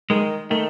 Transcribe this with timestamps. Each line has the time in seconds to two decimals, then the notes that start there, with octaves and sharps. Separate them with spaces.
0.10 D#3 G#3
0.50 D#3 A3